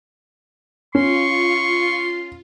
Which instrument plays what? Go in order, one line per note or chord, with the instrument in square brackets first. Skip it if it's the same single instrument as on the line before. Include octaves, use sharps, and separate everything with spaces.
[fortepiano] C#4 [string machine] F4 [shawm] C6 [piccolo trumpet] C#6